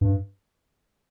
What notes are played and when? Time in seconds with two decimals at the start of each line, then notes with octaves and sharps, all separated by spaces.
0.01 G2